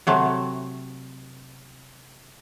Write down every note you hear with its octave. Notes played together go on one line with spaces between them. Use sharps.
C3 F#3 A3